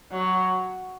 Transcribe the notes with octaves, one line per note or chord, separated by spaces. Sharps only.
F#3